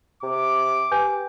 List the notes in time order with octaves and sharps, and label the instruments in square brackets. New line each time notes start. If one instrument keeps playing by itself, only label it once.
[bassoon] C3 [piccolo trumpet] D6
[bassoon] G4 [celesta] B4 G#5 G6